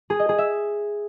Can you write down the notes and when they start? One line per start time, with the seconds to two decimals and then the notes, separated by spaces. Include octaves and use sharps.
0.10 G#4
0.19 D#5
0.29 G#4
0.38 E5